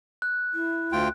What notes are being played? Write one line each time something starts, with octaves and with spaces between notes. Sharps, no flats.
F#6
E4
D2 F4 G5